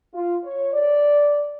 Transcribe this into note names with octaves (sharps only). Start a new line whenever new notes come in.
F4
C#5
D5